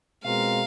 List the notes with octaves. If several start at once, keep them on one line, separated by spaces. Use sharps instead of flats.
B2 G#3 C4 F4 A#4 F5